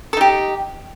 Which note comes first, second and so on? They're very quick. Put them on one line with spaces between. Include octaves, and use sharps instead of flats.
A4 D#4 G4